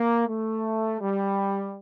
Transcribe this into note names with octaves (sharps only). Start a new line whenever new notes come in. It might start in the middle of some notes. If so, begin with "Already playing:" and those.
Already playing: A#3
A3
G3